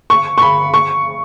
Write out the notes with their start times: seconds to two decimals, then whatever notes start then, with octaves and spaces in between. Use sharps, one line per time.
0.10 C#6
0.38 C#6
0.42 B5
0.74 C#6